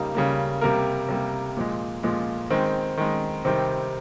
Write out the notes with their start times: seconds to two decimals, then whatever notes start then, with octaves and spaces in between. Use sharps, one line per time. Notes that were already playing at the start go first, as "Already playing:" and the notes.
Already playing: C#3 G3 A#3 D#4
0.15 C#3 G3 A#3
0.61 C3 G3 A#3 A#4
1.09 C3 G3 A#3
1.57 A#2 F3 G#3
2.03 A#2 F3 G#3
2.50 D#3 G#3 C4
2.97 D#3 G#3
3.45 C3 D#3 G3 C4